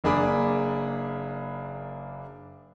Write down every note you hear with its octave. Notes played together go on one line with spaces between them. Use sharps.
F#1 A#3 D4 G#4 B5 D6